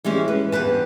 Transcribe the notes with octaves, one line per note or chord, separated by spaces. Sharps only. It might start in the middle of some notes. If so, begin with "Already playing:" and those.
E3 G3 G#3 C#4
B4
E2 G2 B4 A5